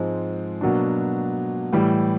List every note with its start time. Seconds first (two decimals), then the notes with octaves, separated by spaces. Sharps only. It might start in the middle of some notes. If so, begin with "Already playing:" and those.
Already playing: G#2 F3 G#3 C4
0.61 B2 F#3 A#3 D4
1.73 A2 E3 G3